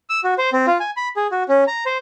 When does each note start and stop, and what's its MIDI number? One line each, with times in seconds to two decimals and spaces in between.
0.09 0.20 88
0.24 0.34 66
0.38 0.50 72
0.53 0.66 60
0.67 0.78 65
0.80 0.90 80
0.97 1.09 83
1.16 1.27 68
1.32 1.43 66
1.49 1.64 61
1.67 1.84 82
1.86 1.98 72